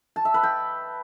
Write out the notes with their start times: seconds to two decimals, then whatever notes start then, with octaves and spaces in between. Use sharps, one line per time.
0.16 A5
0.25 E5
0.34 B4
0.43 G5